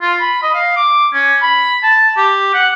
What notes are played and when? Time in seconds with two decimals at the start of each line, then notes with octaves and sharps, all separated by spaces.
0.01 F4
0.20 B5
0.42 D#5
0.54 F5
0.76 D6
1.13 C#4
1.42 B5
1.83 A5
2.16 G4
2.54 F#5